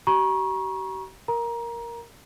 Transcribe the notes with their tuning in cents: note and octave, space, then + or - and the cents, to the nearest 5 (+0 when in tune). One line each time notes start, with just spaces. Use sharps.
G4 -45 A#5 +35 C#6 -10
A#4 +0 A#5 +20